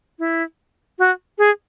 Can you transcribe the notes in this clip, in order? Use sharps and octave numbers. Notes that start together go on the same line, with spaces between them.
E4
F#4
G#4